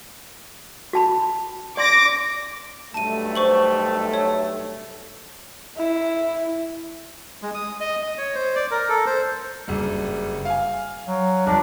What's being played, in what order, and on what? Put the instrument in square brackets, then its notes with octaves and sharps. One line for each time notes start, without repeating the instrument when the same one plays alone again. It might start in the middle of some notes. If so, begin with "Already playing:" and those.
[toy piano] F#4 A5 B5
[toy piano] D5 C6 [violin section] D6 A#6
[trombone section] B1 G2 A3 [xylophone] A5 D#7
[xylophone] C5 C#6 F#7
C#5
[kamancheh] E4
[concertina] G#3
D#6
D#5
D#5
C#5
C5
D5
A#4
A4
C5
[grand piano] F#1 G2
F5 G#5
[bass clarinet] F#3
[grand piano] G1 F2 [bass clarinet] D4